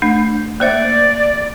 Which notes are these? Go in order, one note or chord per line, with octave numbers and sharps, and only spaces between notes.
A3 D4
A#3 C5 D5 E5